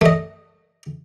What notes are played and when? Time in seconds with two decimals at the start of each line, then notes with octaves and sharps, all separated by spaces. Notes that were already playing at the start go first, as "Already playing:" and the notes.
0.01 A3 D#5